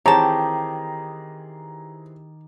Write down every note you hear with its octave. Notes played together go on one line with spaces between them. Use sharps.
D#3 E3 C4 G4 G#4 C#5 A5 A#5